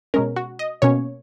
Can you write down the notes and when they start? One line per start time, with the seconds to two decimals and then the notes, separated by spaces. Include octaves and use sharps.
0.14 B2 G#3 C#4 A#4
0.36 F#4
0.59 D#5
0.82 B2 A#3 C#4 C#5